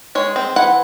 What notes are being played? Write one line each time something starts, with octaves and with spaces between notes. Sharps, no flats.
G#3 C#5
C4
E3 F#5